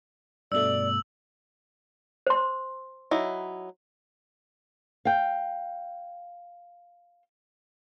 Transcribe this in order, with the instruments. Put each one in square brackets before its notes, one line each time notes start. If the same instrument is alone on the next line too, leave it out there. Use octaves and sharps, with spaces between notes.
[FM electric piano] G2 B2 A3 [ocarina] D5 [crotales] E6 F#7
[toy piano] C5 C6
[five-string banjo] F#3 D#4 E4
[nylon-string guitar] F5 G5